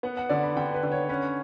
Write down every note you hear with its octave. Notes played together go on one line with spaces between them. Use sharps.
B3 F#5
F#5
D3 D5
B5
D3 G5
B4
D3
C#5
C#4 B4